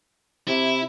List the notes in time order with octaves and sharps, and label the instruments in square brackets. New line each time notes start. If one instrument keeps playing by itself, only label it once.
[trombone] C3 [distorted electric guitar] E4